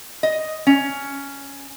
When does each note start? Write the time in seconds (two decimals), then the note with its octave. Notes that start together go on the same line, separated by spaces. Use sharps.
0.23 D#5
0.67 C#4